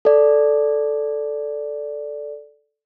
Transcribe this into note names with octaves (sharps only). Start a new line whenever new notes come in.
A4 D5